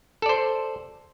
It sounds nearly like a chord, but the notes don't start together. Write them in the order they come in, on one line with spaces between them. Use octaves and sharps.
A4 D5 C5